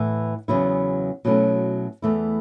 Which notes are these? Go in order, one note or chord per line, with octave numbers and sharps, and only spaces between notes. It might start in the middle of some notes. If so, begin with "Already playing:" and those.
Already playing: A2 E3 B3 E4
E2 C#3 F#3 B3 E4
B2 F#3 A3 C#4 E4
E2 E3 A3 E4